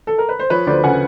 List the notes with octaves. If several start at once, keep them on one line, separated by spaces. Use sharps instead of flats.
A4
A#4
B4
C5
F3 B4 C#5
D2 C5 D5
C#3 F#5 G#5